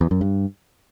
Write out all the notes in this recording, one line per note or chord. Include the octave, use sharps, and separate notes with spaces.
E2
F#2
G2